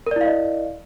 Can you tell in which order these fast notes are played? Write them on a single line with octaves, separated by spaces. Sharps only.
A#4 D5 E4 F5 D#5